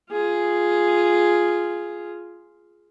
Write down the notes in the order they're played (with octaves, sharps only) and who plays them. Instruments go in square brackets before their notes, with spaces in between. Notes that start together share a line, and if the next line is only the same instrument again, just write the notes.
[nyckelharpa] F4 G#4